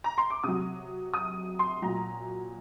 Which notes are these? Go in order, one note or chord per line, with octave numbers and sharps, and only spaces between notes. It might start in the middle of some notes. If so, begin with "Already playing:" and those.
A#5
C6
D6
C3 F#3 D#6
D#6
C6
A#2 F#3 A#5